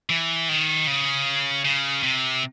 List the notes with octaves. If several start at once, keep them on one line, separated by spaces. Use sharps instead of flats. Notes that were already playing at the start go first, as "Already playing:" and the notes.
E3
D#3
C#3
C#3
C3